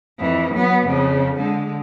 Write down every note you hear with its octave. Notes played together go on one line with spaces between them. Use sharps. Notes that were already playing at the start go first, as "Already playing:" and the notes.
F2 E3
F#3 B3
F2 C#3
D3 G#3